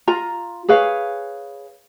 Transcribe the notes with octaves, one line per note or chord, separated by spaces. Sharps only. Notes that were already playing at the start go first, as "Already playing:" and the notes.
F4 A#5
G#4 B4 C#5 F5